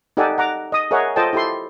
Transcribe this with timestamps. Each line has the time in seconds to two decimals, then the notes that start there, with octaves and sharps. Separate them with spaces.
0.17 D#4 G4 A4 D5 F#5 G#5
0.38 F#5 A#5 D6
0.72 D#5 D#6
0.91 G#4 A#4 C#5 D#5 E5 F#5
1.16 F4 A4 C5 D#5 G5 A5
1.33 E4 G4 A4 C6